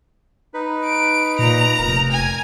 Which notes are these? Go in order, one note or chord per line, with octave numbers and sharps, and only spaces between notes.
D#4 B4
D7
A#2 A#5
F1 A#4
G#5